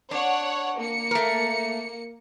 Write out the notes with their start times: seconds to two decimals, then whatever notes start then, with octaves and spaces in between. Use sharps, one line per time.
0.11 D4 C#5 F#5
0.78 A#3 C#7
1.11 A3 A#4